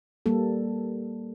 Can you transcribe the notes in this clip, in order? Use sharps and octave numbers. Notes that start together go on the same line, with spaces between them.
G3 A#3 A4